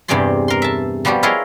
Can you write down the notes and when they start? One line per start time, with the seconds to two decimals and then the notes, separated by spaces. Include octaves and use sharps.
0.08 E2 G2 C3 G#4 D5 C6
0.48 A#4 C6
0.62 E5 A5
1.05 F3 G3 B3 F#4 G4
1.23 E4 F4 G#4 A#4 C#5 D#5